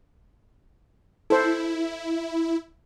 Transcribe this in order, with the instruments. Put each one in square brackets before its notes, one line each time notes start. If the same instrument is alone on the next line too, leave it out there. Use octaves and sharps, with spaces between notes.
[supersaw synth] E4 [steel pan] A4 C5